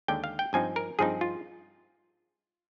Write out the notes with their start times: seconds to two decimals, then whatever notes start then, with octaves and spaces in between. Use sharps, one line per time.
0.08 D#2 D3 G#3 D4 G5
0.24 F5
0.39 G5
0.53 G2 F3 C4 D#4 G#5
0.76 A#4
0.99 G2 F3 C4 D#4 G#4
1.21 F4